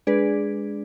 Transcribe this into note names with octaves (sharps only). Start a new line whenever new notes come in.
G#3 D4 G#4 B4 D5